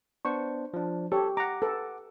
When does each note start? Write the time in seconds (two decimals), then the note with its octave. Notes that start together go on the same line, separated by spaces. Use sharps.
0.25 B3 D4 C5 C#6
0.74 F3 D4
1.12 G4 A4 C#5
1.37 F#5 A#5 D6
1.62 A4 B4